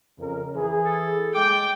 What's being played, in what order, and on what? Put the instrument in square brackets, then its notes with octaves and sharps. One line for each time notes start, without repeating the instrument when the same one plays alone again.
[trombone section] F2 C#3 A#4
E3 G#4
[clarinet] A4
[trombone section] G#3 [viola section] G5 [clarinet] D6